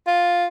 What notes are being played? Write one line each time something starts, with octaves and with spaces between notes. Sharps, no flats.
F4